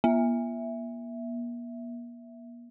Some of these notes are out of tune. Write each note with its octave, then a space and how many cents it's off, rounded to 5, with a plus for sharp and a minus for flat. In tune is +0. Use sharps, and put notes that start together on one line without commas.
A#3 +45 E5 +0